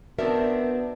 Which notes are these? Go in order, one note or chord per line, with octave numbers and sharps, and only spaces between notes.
D#3 B3 C4 D4 F#4 A#4 E5